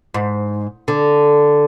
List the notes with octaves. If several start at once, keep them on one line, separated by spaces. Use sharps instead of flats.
G#2
D3